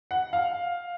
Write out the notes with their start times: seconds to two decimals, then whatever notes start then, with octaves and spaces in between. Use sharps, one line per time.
0.11 F#5
0.33 F5